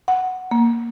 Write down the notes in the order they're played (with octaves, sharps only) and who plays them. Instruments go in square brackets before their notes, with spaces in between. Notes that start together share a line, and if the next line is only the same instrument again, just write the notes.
[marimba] F#5
A#3